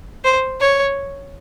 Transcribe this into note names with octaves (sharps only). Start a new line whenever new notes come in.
C5
C#5